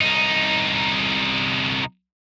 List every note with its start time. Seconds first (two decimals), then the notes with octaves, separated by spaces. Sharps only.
0.01 C2 D#4